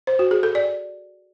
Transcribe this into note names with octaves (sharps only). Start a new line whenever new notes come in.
C5
F#4
G#4
A4
D5